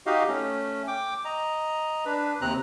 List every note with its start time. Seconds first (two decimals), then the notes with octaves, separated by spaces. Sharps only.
0.06 D#4 F#4 G4 D#5 F5
0.28 A3 C#4
0.87 G5 D6
1.25 D#5 A#5
2.05 D4 B4
2.41 D#2 C3 C4 A#5 F#6